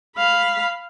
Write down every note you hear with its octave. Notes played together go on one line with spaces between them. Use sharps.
F5 B5